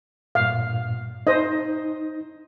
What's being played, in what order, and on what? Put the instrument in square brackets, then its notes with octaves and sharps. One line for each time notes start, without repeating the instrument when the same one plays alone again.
[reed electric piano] G2 A#2 [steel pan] F5
[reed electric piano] D#4 [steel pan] C5 D#5